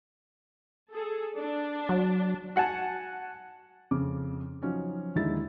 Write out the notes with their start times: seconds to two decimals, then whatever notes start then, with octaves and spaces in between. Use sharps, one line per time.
0.90 G#4 A4
1.36 D4
1.89 F#3
2.56 F#4 F#5 G#5 A5
3.91 F2 C#3 D6
4.62 F3 F#3 C#4 D#4
5.15 D#2 D3 G#3 D#4 E4 A6